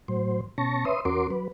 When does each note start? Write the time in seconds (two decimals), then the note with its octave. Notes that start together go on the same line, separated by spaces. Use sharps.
0.08 A2 F#3 C5
0.58 B2 C#4 A5 C#6 A#6
0.85 B4 C#5 E5 C6 D#6
1.05 E2 C#4 F#4 A#4 C6 D6
1.30 F#3 B4